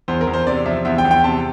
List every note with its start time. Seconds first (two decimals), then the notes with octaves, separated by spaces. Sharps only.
0.08 E2 C5
0.21 A#4
0.27 E2
0.34 C5
0.47 C3 D5
0.66 F3 E5
0.85 E2 E5
0.98 G5
1.05 E2
1.11 G5
1.24 C3 A5